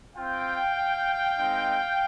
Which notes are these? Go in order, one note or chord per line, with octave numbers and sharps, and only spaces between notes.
C4 F4 F5 G5
G#3 C4 D#4